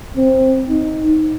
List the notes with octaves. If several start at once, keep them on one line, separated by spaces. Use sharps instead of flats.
C4
D#4